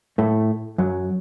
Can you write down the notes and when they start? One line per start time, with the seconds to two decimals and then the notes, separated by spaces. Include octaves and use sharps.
0.18 A2 A3
0.78 F#2 F#3